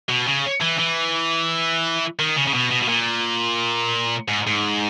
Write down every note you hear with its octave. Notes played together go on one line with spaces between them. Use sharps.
B2
C#3
E3
E3
D#3
C#3
C#3
B2
B2
B2
A#2
G#2
G#2